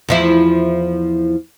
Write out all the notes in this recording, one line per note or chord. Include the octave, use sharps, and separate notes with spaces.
E2 F3 E4